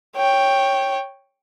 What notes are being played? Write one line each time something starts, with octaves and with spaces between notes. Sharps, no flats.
C#5 G5